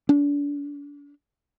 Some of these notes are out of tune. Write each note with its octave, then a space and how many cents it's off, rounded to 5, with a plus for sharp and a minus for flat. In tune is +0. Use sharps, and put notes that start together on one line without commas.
D4 -35